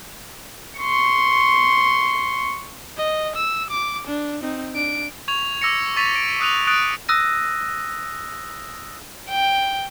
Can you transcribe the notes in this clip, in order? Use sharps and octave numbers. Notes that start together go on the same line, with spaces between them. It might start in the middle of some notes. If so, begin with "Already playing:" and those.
C6 C#6
D#5
E6
D6
D4
C4 D#4
D4 D7
C#6 G#6 F7
D6 E6 A#6 C#7
C#6 A6 B6 D#7 F7
D7
D#6 E6 F#6 B6 D#7 F7
D#6 F#6 A6 D7
D#6 E6 F#6 A#6 D#7
G5